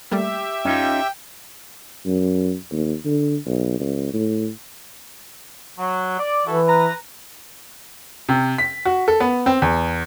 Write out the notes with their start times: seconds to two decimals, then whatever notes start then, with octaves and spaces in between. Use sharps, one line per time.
0.12 G3 A3 A#3 G4 E5
0.65 F#2 C#4 D#4 F4 G5
2.06 F#2
2.72 D#2
3.05 D3
3.46 B1
3.80 C#2
4.13 A2
5.79 F#3
6.19 D5
6.46 E3 E4 F#4 A4
6.67 B4 A#5
8.29 C3
8.58 B6
8.85 F#4
9.08 A4
9.20 B3
9.46 C4
9.62 E2